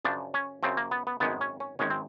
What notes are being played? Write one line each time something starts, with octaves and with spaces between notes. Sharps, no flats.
F#2 C#3 F3 D4
C#4
F#2 C#3 F3 C4
A#3
B3
B3
G#1 F#2 D#3 G#3 B3
C#4
C#4
G#1 F#2 D#3 G#3 C#4
C4